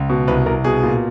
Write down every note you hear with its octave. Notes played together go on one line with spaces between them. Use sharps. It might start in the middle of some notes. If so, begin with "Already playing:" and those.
Already playing: C#2
B2
C2 B4
C2 A#4
B2 G#4
A#2